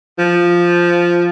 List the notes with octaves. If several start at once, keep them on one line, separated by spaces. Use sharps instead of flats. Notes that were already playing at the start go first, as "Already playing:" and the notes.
F3